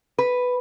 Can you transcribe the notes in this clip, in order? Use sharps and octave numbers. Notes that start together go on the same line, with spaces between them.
B4